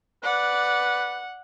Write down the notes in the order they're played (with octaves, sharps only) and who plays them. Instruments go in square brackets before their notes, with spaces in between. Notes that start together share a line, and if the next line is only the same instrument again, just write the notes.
[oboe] B4 [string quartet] D5 [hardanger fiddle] F#5